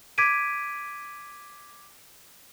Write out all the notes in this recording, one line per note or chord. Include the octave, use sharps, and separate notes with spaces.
D6 G#6 B6 D7 D#7